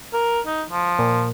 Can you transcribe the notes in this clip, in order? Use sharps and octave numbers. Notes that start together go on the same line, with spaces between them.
A#4
D#4
F3
A#2